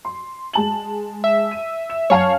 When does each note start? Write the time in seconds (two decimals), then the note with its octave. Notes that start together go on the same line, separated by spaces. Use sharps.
0.05 C6
0.53 G#3 A5 F#7
1.24 E5
1.51 D#7
1.90 E7
2.10 F#2 C#5 F5 A5